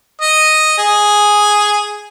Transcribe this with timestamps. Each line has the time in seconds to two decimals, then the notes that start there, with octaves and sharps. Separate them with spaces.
0.21 D#5
0.78 G#4